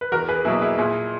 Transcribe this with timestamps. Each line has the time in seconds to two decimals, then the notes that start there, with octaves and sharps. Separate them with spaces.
0.01 B4
0.12 E2 F#4 A#4
0.28 G#4 B4
0.44 B2 F#3 A#3 E4 G#4
0.61 E4 G#4
0.78 A#2 E4 G#4